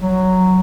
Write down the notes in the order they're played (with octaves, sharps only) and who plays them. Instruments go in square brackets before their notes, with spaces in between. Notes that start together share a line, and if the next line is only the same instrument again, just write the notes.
[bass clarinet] F#3